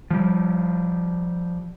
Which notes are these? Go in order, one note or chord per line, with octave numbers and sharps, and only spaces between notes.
F3 G3